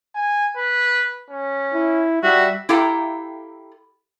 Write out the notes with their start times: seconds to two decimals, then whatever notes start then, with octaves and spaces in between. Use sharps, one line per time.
0.15 G#5
0.57 B4
1.30 C#4
1.74 E4
2.23 G3 F#4 E5
2.69 E4 G4 A4 F5 G5 A#5